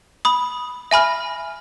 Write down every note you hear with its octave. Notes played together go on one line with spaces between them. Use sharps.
B5 D#6
E5 G#5 B5 F6